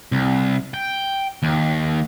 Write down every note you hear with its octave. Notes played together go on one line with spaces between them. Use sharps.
C2
G5
D#2